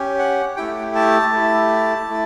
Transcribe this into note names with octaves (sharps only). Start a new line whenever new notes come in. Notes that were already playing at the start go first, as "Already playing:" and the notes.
Already playing: C#4 G4
F#5
A3 E4 G4 G5
A5
A3 E4 G4
A3 E4